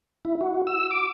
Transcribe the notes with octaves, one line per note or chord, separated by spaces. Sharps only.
E4
F#4
E6
D6